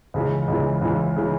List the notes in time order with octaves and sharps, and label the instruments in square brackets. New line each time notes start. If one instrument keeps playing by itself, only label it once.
[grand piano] C#2 C#3 E3
C#2 C#3 E3
C#2 C#3 E3
C#3 E3